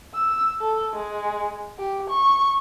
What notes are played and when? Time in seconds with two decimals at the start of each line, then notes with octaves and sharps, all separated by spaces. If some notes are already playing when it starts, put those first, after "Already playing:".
0.14 E6
0.61 A4
0.96 G#3
1.78 G4
2.10 C#6